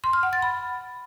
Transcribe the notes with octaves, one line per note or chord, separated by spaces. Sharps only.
C6
F6
F#5
A6
B5